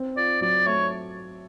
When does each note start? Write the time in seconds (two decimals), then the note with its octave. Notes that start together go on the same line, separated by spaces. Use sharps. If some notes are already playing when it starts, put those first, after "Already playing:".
Already playing: C4
0.16 F4 D5
0.41 F#3 D5
0.66 A3 C#5